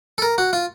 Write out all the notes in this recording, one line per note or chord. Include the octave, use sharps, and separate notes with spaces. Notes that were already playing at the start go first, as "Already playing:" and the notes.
A4
A#4
F#4
F4